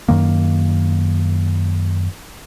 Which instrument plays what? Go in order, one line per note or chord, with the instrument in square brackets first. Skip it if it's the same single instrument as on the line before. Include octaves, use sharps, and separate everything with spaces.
[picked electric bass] F#2 D#3 A#3